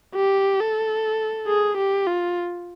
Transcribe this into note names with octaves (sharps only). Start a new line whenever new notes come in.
G4
A4
G#4
G4
F4